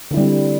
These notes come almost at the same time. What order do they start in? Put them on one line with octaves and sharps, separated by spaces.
D3 E4 G3 C4